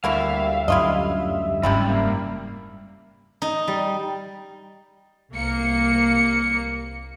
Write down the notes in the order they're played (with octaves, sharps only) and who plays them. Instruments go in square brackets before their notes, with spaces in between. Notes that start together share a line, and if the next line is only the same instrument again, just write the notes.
[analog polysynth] D2 G3 E5 [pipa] A#3 E4 F#4 [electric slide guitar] F5
[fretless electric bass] F#2 [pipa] E4 F4 D#5
[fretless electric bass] F#1 G#2 C#4 [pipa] C3 F3 E4 [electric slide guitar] G3
[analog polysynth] A#3
[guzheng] D#4
G3
[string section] C2 A#3 C#7